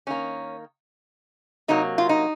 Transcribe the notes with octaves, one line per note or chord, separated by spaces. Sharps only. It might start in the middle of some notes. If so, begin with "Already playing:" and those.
D#3 A#3 C#4
C3 F#3 A#3 D#4
F4
D#4